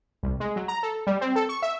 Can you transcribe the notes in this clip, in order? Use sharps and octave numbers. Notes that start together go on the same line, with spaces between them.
C2
G#3
F#3
A#5
A4
G3
C4
A4
C#6
E5